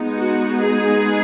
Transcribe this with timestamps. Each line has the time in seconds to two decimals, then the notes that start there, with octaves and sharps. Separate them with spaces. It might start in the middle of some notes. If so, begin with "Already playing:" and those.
Already playing: G#3 B3 D#4
0.16 F#4
0.61 G#4